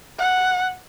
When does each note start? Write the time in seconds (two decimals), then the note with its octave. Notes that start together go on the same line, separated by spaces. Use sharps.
0.19 F#5